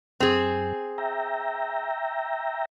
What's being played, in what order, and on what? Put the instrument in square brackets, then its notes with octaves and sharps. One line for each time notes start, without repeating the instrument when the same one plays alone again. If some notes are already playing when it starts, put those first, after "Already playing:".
[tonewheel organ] F#2 [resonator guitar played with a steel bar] C4 G#4
[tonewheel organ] E5 G5 A#5